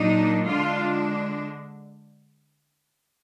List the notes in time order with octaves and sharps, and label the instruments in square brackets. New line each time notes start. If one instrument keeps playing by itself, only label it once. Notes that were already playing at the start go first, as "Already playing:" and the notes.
Already playing: [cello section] A#2 F#3 D4 D#4
D3 G#3 D4 F4